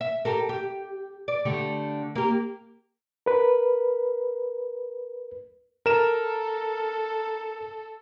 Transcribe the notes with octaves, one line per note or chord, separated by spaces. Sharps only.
E5
G4 A4 A#4
G4
D5
D3 A3 G4
A#3 G4
A#4 B4
A4 A#4 E7